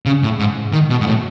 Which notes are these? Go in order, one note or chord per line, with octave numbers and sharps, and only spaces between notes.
C#3
A2
G#2
D#3
B2
G#2
A2